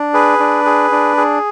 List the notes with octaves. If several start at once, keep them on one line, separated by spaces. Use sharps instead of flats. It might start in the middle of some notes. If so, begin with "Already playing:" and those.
Already playing: D4
G#4 B4
D4
G#4
D4
G#4